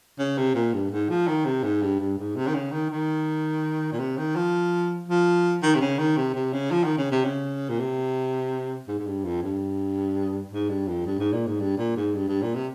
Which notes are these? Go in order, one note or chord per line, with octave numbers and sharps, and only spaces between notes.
C#3
C3
A#2
G2
G#2
F3
D#3
C3
G#2
G2
G2
G#2
C3
D#3
C#3
D#3
D#3
A#2
C3
D#3
F3
F3
D#3
C3
C#3
D#3
C3
C3
C#3
F3
D#3
C#3
C3
C#3
A#2
C3
G#2
G#2
G2
F2
G2
G#2
G2
F2
G2
G#2
A#2
G#2
G2
A#2
G#2
G2
G2
A#2
C3